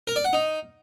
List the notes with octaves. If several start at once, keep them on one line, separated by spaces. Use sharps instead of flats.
A#4
D5
F#5
D#4